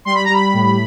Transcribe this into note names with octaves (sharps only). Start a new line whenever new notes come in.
G3 C6
B5
A#5
G3 B5
A2